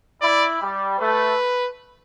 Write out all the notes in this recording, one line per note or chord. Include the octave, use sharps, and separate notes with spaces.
E4 D5
G3
A3 B4